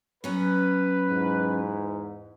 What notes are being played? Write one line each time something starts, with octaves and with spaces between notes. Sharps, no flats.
F#3 B3 C#4 B4
E2 G#2